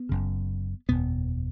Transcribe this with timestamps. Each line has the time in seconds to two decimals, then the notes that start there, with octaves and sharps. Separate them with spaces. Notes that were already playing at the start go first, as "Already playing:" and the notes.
Already playing: B3
0.09 F#1 F#2 C#3
0.89 F#1 E2 B2 B3